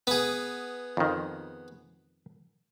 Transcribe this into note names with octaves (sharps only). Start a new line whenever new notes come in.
B3 G#4
F2 D#3